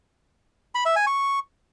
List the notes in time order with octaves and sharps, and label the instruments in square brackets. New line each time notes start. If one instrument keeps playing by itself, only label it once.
[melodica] B5
E5
G#5
C#6